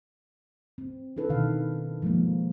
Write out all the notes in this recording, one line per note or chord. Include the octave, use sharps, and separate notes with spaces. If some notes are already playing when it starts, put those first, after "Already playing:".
C4
D4 E4 A4 B4
B2 D#3 F5
F3 G#3 A#3